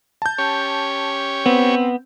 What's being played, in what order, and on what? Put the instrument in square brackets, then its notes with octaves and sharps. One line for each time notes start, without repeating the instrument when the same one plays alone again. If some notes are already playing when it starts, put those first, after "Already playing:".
[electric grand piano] A5 G6
[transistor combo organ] C#4 G4 C#5
[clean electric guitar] B3 [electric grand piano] C4